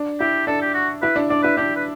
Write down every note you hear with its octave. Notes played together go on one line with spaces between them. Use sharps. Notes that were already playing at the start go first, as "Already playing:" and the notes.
Already playing: D4
E4 G4
D4 A4
G4
F#4
E4 B4
D4
D4 D5
E4 B4
D4 G4
B4